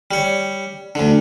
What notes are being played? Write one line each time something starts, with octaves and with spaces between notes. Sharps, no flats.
G3 C#5
D2 D3